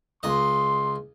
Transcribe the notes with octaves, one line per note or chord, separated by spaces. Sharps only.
C#2 D#5 C6